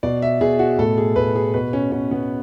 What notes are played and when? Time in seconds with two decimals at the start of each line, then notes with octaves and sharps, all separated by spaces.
0.03 B2 D5
0.22 E5
0.41 B2 G#4
0.59 F#4
0.78 A2 A4
0.98 G#4
1.16 A2 B4
1.35 G#4
1.54 B2 B4
1.73 C#4
1.92 B2 C#4
2.11 B3